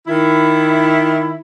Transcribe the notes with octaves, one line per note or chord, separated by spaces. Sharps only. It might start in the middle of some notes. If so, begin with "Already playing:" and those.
D#3 E4